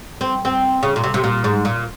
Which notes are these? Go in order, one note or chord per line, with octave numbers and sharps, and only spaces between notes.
C4
C4
C#3
A#2
C3
C3
A#2
G#2
A#2